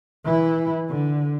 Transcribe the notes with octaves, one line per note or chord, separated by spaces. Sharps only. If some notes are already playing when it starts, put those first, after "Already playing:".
E3 E4
D3